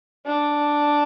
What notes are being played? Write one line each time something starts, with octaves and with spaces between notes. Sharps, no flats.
D4